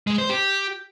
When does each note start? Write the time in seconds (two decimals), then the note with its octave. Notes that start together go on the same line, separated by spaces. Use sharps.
0.07 G#3
0.18 C5
0.29 G4